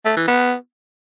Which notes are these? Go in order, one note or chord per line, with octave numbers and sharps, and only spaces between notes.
A3
E3
B3